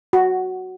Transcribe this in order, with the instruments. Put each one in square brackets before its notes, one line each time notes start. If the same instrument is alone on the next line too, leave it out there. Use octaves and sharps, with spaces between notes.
[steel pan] F#4